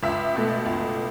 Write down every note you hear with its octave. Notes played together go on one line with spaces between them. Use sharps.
C#2 E5
B2 A3
C#2